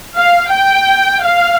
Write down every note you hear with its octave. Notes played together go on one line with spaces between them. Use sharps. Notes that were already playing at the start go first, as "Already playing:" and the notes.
F5
G5
F5